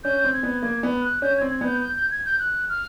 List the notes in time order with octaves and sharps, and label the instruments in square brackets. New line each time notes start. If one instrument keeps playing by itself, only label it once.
[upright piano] C#4 [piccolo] G6
[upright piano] C4
[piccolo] G#6
[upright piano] B3
[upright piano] A#3 [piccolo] G#6
[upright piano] B3
[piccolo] F#6
[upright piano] C#4 [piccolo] G6
[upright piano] C4 [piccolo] G#6
[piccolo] G#6
[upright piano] B3
[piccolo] G6
G6
G6
G#6
G6
F#6
F6